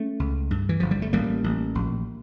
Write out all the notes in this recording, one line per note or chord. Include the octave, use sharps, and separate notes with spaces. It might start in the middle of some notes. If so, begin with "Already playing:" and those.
Already playing: A3 C#4
C#2
G2
E3
G1 F3
G3
A3
A1 G3 A#3
A1
A#1